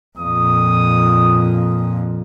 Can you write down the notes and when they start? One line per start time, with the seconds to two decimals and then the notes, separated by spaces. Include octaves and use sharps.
0.19 F2 A#2 D#6